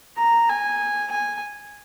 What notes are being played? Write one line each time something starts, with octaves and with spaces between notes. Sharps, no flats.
A#5
G#5
G#5